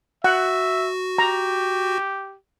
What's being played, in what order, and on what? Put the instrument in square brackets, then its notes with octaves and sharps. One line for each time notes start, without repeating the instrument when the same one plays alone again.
[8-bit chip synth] F#4 [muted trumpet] E5 [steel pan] F#5
[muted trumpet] G4 [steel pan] A#5